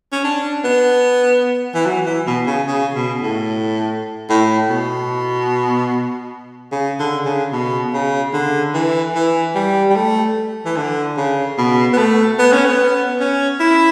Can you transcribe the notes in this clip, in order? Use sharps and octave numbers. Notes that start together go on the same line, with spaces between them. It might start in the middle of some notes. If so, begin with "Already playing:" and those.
C#4
D4
B3
E3
F#3
E3
B2
C#3
C#3
B2
A2
A2
B2
C#3
D3
C#3
B2
C#3
D3
E3
E3
G3
G3
A3
E3
D3
C#3
B2
B3
A3
B3
C#4
B3
C#4
E4